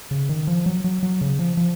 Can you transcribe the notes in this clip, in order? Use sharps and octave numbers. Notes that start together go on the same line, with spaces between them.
C#3
D#3
F3
F#3
F#3
F#3
C#3
F3
F3